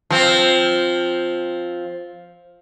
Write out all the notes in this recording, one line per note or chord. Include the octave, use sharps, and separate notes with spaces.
F3 C4